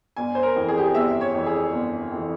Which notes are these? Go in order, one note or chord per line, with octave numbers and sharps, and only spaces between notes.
G1 G#5
C5
A#4
F2 E3
G#4
G4
G#4
G1 E5
C#5
F2 E3
G#4
G1
F2 E3